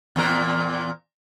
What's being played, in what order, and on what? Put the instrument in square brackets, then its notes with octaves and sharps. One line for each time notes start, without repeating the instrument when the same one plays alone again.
[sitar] E2 A#2 A#4